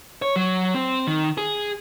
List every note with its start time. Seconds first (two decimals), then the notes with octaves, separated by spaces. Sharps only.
0.22 C#5
0.36 F#3
0.74 C4
1.07 D#3
1.38 G#4